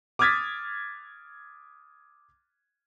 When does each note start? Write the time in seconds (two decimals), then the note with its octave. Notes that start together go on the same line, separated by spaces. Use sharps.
0.19 D6 D#6 F6 G#6 A6 B6